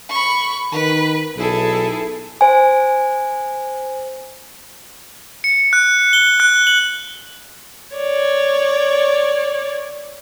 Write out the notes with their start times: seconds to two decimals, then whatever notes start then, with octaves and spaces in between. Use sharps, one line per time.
0.10 B5 C#6
0.72 D#3 B4
1.37 B1 E4 G#4 A4
2.41 C5 G#5
5.44 C#7
5.73 F#6
6.13 G7
6.40 F#6
6.67 F#7
7.96 C#5 D5